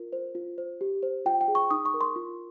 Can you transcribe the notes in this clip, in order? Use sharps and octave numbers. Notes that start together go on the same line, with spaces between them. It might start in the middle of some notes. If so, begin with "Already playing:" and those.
Already playing: F4 A#4
C5
F4
C5
G4
C5
F4 G5
G5
G#4
C#6
D#4 D#6
C#6
A#4
C6
F4